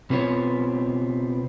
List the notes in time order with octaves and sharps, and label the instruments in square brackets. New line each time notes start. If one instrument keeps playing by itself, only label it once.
[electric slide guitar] B2 B3 C4 F4 C#5